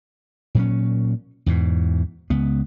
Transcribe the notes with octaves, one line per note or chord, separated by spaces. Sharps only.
A#2 F#3 C#4
E2 G#2 B2
C#2 B3